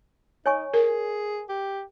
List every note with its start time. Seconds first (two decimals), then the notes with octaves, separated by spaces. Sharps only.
0.46 D#4 C#5 G#5 C#6
0.74 G#4 A#4
1.49 G4